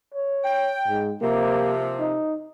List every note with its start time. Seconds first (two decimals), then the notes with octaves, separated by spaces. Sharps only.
0.14 C#5
0.44 G5
0.88 G#2
1.22 C3 F3 A#3
2.00 D#4